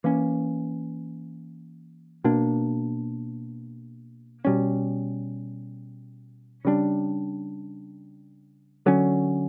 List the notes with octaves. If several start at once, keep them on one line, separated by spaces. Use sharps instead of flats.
E3 A#3 C#4
B2 A#3 D4
B2 G3 C#4
C#3 G3 B3 D4
D3 F#3 C#4